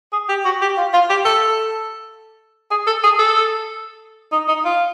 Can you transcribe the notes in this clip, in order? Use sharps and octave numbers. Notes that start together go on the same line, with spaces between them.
G#4
G4
F#4
G4
F4
F4
G4
A4
G#4
A4
G#4
A4
D#4
D#4
F4